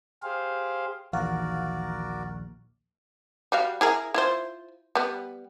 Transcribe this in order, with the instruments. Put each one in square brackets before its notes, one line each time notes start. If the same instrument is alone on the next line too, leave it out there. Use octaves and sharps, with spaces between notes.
[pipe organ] G4 G#4 C5 F5
[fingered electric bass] A#1 D#2 [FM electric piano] E3 F5 F#5 [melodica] F#4 A#4 D5
[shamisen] G3 F#4 F5
E4 G#4 A#4
E4 F4 C5
G3 B3